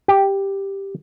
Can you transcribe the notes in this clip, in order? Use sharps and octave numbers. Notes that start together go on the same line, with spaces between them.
G4